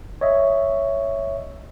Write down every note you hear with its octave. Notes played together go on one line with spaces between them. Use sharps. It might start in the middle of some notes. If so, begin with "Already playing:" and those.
C#5 D#5 E5